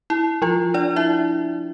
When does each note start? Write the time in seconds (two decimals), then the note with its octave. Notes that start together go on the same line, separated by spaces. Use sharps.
0.10 E4
0.42 F3 F4
0.74 D4 D5
0.96 E4 E5